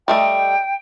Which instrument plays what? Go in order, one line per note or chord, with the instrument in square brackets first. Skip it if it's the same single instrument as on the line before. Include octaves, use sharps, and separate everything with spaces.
[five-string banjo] G3 A3 D#5 [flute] G5